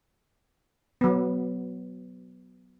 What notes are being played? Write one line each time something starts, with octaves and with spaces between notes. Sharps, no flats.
F#3 B3